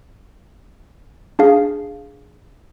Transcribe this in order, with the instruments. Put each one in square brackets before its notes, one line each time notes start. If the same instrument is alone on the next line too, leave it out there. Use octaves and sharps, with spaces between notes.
[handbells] D4 G#4 F5